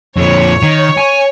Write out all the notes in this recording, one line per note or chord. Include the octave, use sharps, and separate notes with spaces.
F2 A#2 C#5
D#3
G#5